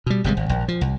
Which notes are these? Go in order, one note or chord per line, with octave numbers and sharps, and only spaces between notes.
B2 G3
G1 C3 G3 G#3
G#1
A#1
F3
C2